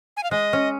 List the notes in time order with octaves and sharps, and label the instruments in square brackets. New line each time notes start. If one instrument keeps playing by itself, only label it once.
[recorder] G#5
F5
[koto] G#3 [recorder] D#5
[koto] C#4